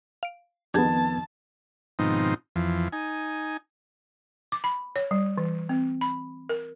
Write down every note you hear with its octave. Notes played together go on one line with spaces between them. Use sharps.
F5 D7
F2 D#3 B3 D4 G4 G#4 A5 G#6
G#2 B2 D#3 F3 C4 D#4
F2 E3 F3
D#4 G#5
D6
B5
C#5
G3
E3
C4
B5
A#4